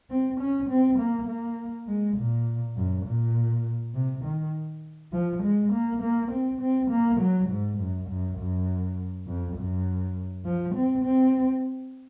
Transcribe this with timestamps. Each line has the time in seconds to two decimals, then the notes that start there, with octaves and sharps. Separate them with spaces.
0.10 C4
0.40 C#4
0.69 C4
0.99 A#3
1.28 A#3
1.88 G#3
2.18 A#2
2.77 F#2
3.06 A#2
3.94 C3
4.24 D#3
5.13 F3
5.43 G#3
5.72 A#3
6.02 A#3
6.31 C4
6.61 C4
6.91 A#3
7.20 F#3
7.50 G#2
7.79 F#2
8.09 F#2
8.38 F#2
9.27 F2
9.57 F#2
10.45 F3
10.75 C4
11.05 C4